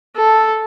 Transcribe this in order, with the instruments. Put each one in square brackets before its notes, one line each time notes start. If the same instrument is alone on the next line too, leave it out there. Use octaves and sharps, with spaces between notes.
[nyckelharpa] A4